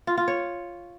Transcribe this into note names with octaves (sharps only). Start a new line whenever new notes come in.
F4
F4
C#5